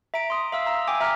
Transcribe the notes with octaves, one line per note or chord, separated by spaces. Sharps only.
E5 A#5 D7
C6 D#6
E5 F5 E6
A#5 E6
G5 G#5 D6
E5 A#5 F6